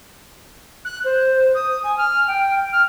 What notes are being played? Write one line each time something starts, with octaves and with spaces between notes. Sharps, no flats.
F#6
C5
D#6
G#5
F6
G5
F6